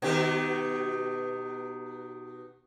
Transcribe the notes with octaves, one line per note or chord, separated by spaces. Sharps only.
B2 D#3 G4